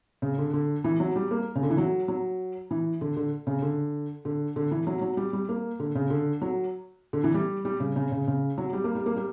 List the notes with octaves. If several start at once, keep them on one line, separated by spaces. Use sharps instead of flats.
C#3
D3
D3
E3
F#3
G3
A#3
C#3
D3
E3
F#3
F#3
E3
D3
D3
C#3
D3
D3
D3
E3
F#3
F#3
G3
G3
A#3
D3
C#3
D3
F#3
D3
E3
G3
G3
C#3
C#3
C#3
C#3
F#3
G3
A#3
G3
A#3
G3